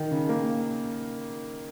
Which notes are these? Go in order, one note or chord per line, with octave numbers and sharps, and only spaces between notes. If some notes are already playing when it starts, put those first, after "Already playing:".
Already playing: D#3
C#3
A#3